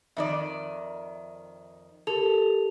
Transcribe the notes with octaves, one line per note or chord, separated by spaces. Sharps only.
F2 D#3 D5 E5
G4 A4 A#4 F7